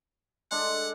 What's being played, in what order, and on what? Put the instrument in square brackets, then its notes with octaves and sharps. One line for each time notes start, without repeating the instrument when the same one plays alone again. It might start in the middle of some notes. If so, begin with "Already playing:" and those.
[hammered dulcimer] G#3 D4 A4 [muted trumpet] F#5